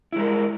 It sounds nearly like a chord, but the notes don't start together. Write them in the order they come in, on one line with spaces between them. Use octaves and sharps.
E4 G#3 A#4